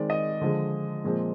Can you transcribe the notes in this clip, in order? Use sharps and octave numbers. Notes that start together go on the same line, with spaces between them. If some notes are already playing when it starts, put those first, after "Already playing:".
Already playing: D#3 G#3 C4 D5
D#5
D3 F3 G#3
A#2 F3 G#3 C4